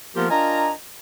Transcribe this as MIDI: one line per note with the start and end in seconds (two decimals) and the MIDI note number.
0.16 0.27 53
0.16 0.27 58
0.16 0.27 59
0.16 0.27 65
0.16 0.27 67
0.16 0.27 70
0.30 0.72 62
0.30 0.72 65
0.30 0.72 70
0.30 0.72 75
0.30 0.72 80
0.30 0.72 82